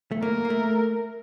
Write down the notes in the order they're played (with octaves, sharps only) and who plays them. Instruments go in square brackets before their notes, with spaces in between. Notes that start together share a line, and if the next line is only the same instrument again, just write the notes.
[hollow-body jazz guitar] A3
[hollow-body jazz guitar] A#3 [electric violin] A#4
[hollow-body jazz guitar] A#3
A3